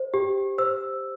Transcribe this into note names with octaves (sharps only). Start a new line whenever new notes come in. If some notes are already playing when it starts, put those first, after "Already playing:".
Already playing: C5
G4
C5 E6